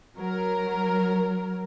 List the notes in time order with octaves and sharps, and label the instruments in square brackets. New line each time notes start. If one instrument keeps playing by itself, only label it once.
[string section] F#3 A#4